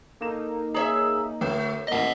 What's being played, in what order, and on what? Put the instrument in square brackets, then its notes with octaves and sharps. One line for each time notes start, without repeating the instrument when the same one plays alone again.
[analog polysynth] A#3 D#4 [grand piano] A4 A#4 E7
[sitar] G#4 C#5 E5 [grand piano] A#5 D#6 F#7
[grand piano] D2 G6 [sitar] A3
[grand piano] A1 A#3 [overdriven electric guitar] D#5 F#5